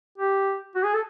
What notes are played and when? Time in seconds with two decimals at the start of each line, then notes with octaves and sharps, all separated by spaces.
0.18 G4
0.75 F#4
0.84 G#4
0.94 A4